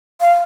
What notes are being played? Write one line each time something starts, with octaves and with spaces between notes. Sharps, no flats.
F5